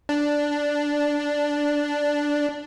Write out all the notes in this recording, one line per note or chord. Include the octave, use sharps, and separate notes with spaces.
D4